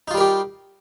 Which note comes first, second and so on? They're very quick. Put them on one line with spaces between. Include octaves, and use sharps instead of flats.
D#4 F4 G3 A#4 G4